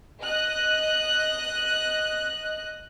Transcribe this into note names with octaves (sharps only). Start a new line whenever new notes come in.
D#5 F#6